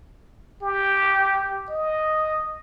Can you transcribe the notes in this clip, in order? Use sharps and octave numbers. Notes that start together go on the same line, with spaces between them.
G4
D#5